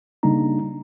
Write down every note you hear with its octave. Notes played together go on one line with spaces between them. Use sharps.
C#3 G3 A#3 D4 D#4 A#5